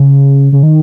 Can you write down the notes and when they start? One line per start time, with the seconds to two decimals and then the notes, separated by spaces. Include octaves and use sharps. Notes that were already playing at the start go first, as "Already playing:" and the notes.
Already playing: C#3
0.53 C#3
0.63 D#3